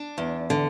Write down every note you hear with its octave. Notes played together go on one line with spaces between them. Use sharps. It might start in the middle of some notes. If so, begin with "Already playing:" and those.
Already playing: D4
E2
D3